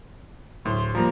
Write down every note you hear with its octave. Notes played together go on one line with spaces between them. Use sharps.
D1 A2 C6
F3 G3 A#3 A#5